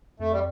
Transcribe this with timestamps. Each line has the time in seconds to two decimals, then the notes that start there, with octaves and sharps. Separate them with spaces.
0.19 F2 A3
0.32 G3